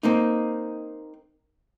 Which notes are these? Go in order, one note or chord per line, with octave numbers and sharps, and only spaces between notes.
A#3 C4 D#4